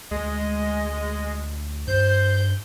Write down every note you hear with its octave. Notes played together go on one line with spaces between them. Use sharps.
D2 G#3 D#5
G2 C5 G6